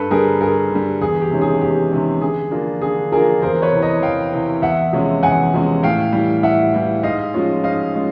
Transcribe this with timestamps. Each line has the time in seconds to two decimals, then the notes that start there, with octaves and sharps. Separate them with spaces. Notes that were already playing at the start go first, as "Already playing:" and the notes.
Already playing: G2 A4 B4
0.10 D3 G3 G#4 A#4
0.41 G2 G#4 A#4
0.71 D3 G3
1.01 E2 G#4
1.22 G4
1.31 C3 D#3 G#3 C#4
1.42 G#4
1.61 E2 G4
1.92 C3 D#3 G#3 C#4
2.22 D3 G#4
2.51 F3 A#3 D4 F4
2.82 D3 G#4
3.11 F3 A#3 D4 F4 G#4 A#4
3.42 E2 A#4 C5
3.62 B4 C#5
3.72 C3 E3
3.82 C#5 D#5
4.02 E2 F5 G5
4.32 C3 E3
4.62 E2 E5 F#5
4.93 C3 F3 G#3 C#4
5.23 E2 F#5 G#5
5.53 C3 F3 G#3 C#4
5.83 A2 F5 G5
6.13 E3 G3
6.43 A2 E5 F#5
6.74 E3 G3
7.03 G#2 D#5 F5
7.34 F3 G#3 C#4 F4
7.63 G#2 D#5 F5
7.93 G#3 C#4 F4